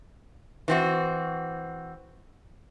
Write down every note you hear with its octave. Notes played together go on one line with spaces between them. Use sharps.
E3 C4 F#4